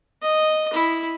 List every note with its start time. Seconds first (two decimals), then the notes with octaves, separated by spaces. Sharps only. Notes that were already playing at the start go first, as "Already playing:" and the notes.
0.22 D#5
0.73 E4